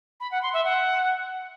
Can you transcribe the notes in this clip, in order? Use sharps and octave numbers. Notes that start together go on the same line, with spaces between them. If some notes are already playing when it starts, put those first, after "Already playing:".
B5
F#5
C6
E5
F#5